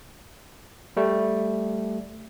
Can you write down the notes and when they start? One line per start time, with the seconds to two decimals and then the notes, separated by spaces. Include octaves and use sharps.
0.97 G3 A3